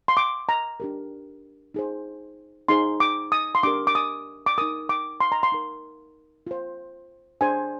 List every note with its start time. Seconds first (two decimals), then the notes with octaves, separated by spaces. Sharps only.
0.08 C6
0.17 D6
0.49 A#5
0.80 D4 G4 A#4
1.74 D#4 G#4 C5
2.68 D#4 G#4 C5 C6
3.00 D6
3.32 D#6
3.55 C6
3.63 D4 G4 A#4 D6
3.87 D6
3.95 D#6
4.46 D6
4.58 D#4 A#4 D#6
4.89 D6
5.21 C6
5.32 A#5
5.43 C6
5.52 D#4 A#4
6.47 F4 C5
7.41 D4 G#4 C5 G#5